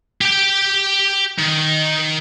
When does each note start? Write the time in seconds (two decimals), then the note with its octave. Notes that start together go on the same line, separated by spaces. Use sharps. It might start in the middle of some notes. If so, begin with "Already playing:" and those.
0.21 G4 G5
1.39 D#3